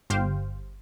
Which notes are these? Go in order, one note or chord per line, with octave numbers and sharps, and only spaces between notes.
G1 G4 C5 F5 G5